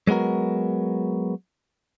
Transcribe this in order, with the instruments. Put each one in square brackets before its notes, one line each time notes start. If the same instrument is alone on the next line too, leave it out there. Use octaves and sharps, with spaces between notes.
[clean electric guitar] F#3 G#3 B3 F#4 A#4